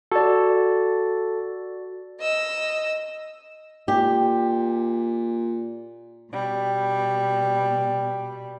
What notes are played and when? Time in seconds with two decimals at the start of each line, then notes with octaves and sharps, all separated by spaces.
0.11 F#4 A4 D5
2.20 D#5 E6
3.88 A#2 G4
6.31 B2 G3